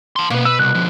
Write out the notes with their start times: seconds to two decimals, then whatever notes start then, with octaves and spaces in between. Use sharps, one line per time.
0.16 A5 C6
0.30 B2 A#3 B4
0.45 B4 E6
0.59 C2 F#6
0.75 D3 F3